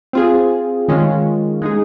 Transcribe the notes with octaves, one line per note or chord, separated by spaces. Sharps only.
C4 F4 G#4
D#3 G#3 C#4 F4
G#3 D#4 G#4